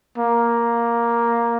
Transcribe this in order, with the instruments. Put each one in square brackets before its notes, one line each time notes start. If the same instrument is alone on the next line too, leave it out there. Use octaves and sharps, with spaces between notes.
[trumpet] A#3